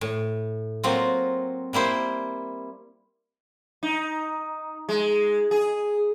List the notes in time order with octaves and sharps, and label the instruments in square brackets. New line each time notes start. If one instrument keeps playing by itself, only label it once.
[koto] A2
F#3 A#3 C4 F4
G3 A#3 E4 C5
[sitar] D#4
G#3
G#4